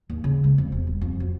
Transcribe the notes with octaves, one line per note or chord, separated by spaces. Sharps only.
D#2
C#3
G#3
F2
E1
G3
F2
F#3